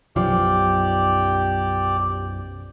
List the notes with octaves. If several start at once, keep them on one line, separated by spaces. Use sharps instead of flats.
B1 F#2 F3 G4 D5